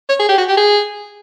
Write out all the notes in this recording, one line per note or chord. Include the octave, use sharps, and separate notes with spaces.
C#5
G#4
G4
F#4
G4
G#4